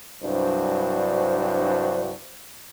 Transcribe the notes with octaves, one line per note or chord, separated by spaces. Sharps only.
C2 G2 F#3 D4 F#4 C5